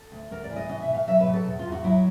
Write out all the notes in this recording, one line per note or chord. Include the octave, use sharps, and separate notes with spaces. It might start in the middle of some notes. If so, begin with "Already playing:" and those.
Already playing: A4
D2
D2 A#4
D5
E3
D#5
B2 D#5
E5
B2
F5
F#3 E5
B4
B2
A4
E2
F4
E2
F#4
F#3 E4